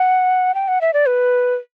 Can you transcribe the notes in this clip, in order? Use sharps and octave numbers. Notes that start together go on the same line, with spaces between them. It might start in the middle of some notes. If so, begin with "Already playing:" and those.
Already playing: F#5
G5
F#5
E5
D5
B4